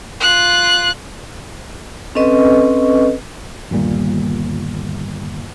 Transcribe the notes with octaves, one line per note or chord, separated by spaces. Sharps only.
F4 F#6
C4 C#4 A4 B4 D#5 C#6
G1 D#2 A#2 G3